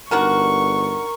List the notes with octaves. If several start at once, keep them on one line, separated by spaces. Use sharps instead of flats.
G1 D3 D#3 F#4 A#4 C#6